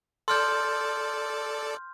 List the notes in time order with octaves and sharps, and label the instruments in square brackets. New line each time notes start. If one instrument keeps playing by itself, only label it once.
[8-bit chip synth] A4 D5 [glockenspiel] C6 F6 G6